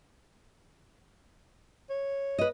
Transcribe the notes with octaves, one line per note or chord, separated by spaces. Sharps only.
C#5
B4 D#5